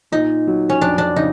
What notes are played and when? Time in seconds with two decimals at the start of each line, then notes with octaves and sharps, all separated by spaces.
0.12 A#2 D#4
0.47 F#3
0.69 C#4
0.81 F2 D4
0.98 D4
1.16 C#3 D#4